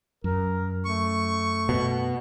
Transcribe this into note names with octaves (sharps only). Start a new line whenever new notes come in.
F#2 A#4
A3 C#6
B2